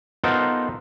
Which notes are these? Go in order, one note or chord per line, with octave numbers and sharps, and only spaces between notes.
B3 D#4 F4 A4 A#4 C5